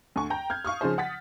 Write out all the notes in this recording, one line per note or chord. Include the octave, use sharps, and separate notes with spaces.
D2 G#5 C#6
G5 A#5 G6
F6 G6 G#6
F5 C#6 D#6 F6
C#3 F3 D#4 G#4 C5
F#5 D#6 A6 B6